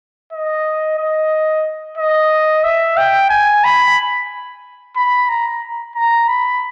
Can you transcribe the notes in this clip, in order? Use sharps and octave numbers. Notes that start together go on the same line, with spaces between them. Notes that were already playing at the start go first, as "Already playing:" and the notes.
D#5
D#5
D#5
E5
G5
G#5
B5
B5
A#5
A#5
B5